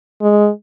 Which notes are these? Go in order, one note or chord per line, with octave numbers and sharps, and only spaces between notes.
G#3